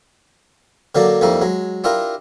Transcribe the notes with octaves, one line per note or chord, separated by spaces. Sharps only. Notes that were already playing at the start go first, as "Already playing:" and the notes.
D3 F#3 A#3 D4 D5
F2 G3 A#3 D#4 E4
F#3 G#3
D4 E4 F4 G4 A#4